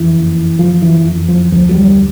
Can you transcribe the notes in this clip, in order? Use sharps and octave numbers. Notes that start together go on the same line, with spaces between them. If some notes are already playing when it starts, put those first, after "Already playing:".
Already playing: F2 E3
F#1
F#1 F3
E3
F2
F3
D2 F3
F#3
G3